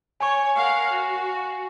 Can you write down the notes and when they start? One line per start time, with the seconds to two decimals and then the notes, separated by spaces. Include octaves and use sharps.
0.20 C#5 G#5 C#6
0.57 A#4 F5 F#5
0.92 F#4